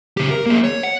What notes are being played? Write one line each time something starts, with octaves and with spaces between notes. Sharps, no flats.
C#3 G4
A#4
A#3 G#4
C#5
F#5